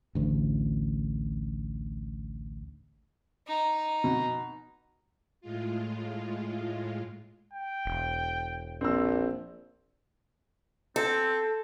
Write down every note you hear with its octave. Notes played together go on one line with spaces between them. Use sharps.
A1 D2
D#4
B2
A2 G#3 F4
G5
E1
A#1 C4 E6
C4 A4